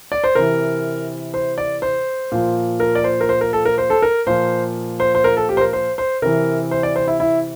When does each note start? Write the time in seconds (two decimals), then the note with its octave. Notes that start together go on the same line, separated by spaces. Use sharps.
0.12 D5
0.24 C5
0.35 C3 E3 A#4
1.34 C5
1.58 D5
1.82 C5
2.32 A#2 F3
2.80 A#4
2.95 D5
3.04 C5
3.21 A#4
3.29 C5
3.41 A#4
3.53 A4
3.65 A#4
3.78 C5
3.90 A4
4.02 A#4
4.26 A#2 F3 C5
5.00 C5
5.15 C5
5.24 A#4
5.37 A4
5.49 G4
5.57 C5
5.61 A#4
5.73 C5
5.98 C5
6.22 C3 E3 A#4
6.71 C5
6.83 D5
6.96 C5
7.08 E4
7.20 E4